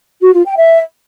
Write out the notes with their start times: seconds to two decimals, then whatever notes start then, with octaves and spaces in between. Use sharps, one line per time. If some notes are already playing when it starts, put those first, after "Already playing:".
0.22 F#4
0.34 F4
0.46 G5
0.57 E5